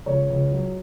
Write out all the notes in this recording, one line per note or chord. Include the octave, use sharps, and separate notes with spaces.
C#2 C#5
C#2
F#3